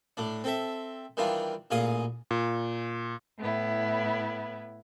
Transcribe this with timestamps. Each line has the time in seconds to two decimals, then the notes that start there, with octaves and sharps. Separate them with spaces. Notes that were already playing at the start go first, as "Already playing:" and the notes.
0.17 A2 D4
0.44 C4 A4 E5
1.17 D#3 E3 G3 D4 F4
1.71 A1 A#2 G#4 F5 D#6
2.31 A#2
3.37 A2 B3 E4